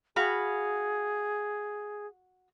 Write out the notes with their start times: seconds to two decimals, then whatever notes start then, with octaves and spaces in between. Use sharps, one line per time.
0.16 F#4 G#4 F5 B5